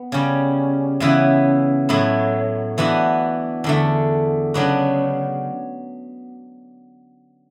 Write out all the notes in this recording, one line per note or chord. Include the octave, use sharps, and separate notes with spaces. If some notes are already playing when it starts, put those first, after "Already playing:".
Already playing: B3
C#3 G3 C#4
C#3 E3 B3 E4
A2 F#3 B3 E4
E3 B3 D4 F#4
E2 D3 A3
C#3 F#3 B3 D4 F#4